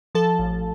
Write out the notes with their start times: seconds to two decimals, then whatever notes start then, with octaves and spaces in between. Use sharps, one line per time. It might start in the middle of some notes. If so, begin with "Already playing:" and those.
0.15 F3 A4 A5
0.39 A1